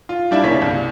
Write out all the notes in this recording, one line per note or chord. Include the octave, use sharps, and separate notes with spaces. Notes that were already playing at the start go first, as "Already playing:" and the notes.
F4
G3 D4 E4 E5
E1 A#3 C#4 C#5 B6
C2